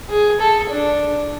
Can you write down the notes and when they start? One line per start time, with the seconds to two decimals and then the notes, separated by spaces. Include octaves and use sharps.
0.10 G#4
0.40 A4
0.69 D4